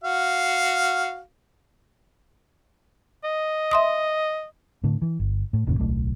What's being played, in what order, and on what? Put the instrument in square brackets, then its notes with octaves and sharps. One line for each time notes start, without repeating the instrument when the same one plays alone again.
[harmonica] F#4 F5
[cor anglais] D#5
[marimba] E5 C6 D#6
[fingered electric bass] A2 D3
E3
G1
A2
F#1 D#2 A#2 C#3
D1 B1 A3